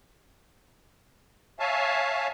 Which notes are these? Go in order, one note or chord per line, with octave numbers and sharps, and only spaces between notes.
C#5 E5 F5 G#5 A5